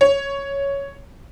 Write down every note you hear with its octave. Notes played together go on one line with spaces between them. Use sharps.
C#5